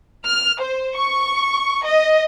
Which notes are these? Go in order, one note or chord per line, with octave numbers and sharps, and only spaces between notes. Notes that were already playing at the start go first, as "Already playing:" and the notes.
F6
C5
C#6
D#5